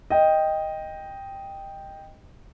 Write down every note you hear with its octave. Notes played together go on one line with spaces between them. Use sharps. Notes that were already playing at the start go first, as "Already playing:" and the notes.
D#5 G5